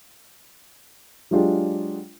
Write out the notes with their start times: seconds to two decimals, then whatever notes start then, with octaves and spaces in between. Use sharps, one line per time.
1.31 F#3 G#3 D4 F4 G4 G#4